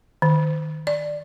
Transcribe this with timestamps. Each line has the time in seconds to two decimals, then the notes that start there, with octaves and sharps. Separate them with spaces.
0.22 D#3
0.87 D5